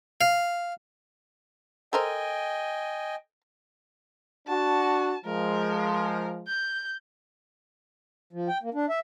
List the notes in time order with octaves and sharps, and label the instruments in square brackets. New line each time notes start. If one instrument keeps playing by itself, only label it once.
[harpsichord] F5
[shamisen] A4 A#4 C5 [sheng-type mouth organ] D#5 G5 G#5
[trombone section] D4 F#4 [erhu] A5
[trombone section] F3 G#3 [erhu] A#4
[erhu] G6
[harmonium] F3
G5
A#3
D4
E5